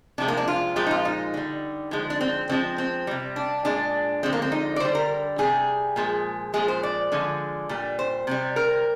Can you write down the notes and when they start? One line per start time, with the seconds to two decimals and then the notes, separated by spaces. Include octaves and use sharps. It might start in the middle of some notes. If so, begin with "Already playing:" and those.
0.18 C3 F3 G#3 D4
0.28 A#3
0.37 D4
0.48 F4
0.76 A#2 F3 G#3 G4
0.86 D#4
0.91 F4
1.05 D#4
1.34 D3 G3
1.91 D3 F3 G#3
2.10 D4
2.21 C4
2.49 D3 F3 G#3 C4
2.78 C4
3.07 C3 G3
3.36 D4
3.65 A#2 G#3 D4
4.23 D3 F3 G#3 C4
4.33 A#3
4.42 C4
4.52 D#4
4.76 D5
4.80 D3 G3 C5
4.95 A#4
5.38 C3 G3 G#4
5.96 A#2 F3 G#3
6.54 A#2 F3 G#3 G#4
6.68 C5
6.83 D5
7.12 D3 F3 G#3
7.69 A#2 G3
7.99 C5
8.27 C3 G3
8.56 A#4